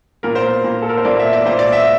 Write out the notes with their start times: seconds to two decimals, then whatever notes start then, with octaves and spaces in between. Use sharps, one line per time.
0.23 A#2 A#4
0.35 C5
0.47 A#4
0.64 A#2
0.82 A4
0.89 A#4
0.97 C5
1.05 A#2 D5
1.19 E5
1.33 D5
1.46 A#2 C5
1.59 D5
1.72 E5